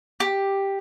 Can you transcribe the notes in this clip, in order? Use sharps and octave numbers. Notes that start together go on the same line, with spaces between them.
G4